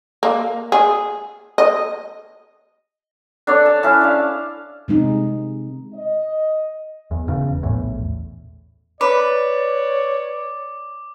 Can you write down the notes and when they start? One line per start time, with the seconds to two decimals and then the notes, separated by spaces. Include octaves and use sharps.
0.23 A#3
0.72 G#4
1.58 D#5
3.47 D4 A4 C#5 D5
3.66 A5
3.83 C#4 E4 A5
4.01 D4 F5
4.88 C3 G#3 D#4
5.94 D#5
7.11 E2
7.27 E1 E2 C#3
7.63 A#1 E2 A2
9.01 B4 C#5 D5 D6